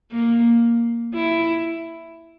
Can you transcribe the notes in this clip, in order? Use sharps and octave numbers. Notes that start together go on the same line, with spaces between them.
A#3
E4